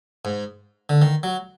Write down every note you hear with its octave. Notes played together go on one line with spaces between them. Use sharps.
G#2
D3
D#3
F#3